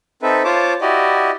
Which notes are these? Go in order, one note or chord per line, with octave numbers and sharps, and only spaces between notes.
C4 D#4 A4 B4 E5
F4 C5 C#5 A5 D6
E4 F#4 G4 D5 D#5